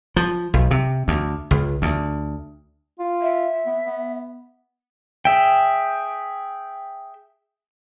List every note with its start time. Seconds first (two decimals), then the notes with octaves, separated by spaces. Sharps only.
0.16 F3
0.54 B1
0.71 C3
1.08 D2
1.51 C#2
1.82 D2
2.99 F4
3.21 E5
3.66 B3
3.86 B3
5.25 G#4 E5 G5